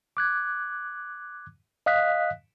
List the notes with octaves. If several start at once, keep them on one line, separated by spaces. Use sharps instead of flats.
D6 F#6 G#6
D#5 F5 D#6 F#6 B6